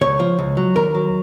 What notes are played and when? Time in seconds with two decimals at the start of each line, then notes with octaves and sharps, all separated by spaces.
0.01 C#2 C#5
0.20 F3
0.39 C#2
0.57 F#3
0.76 D#2 A#4
0.95 F#3